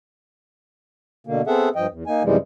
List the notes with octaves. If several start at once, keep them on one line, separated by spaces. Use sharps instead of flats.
B2 D3 A#3
B3 C4 G#4 A4 E5 F#5
G2 F3 D#5 G5
E2
A#3 D#4 G#5
F#2 C3 E3 F3 G3 G#3